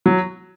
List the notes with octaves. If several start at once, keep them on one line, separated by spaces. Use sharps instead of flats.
F#3